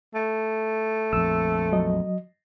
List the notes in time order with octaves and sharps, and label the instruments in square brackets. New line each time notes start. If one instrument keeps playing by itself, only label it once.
[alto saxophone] A3
[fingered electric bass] A#1 F2 [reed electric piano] E6
[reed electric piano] F#3 D#5